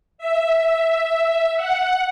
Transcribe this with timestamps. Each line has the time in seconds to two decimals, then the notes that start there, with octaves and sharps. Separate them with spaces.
0.18 E5
1.56 F#5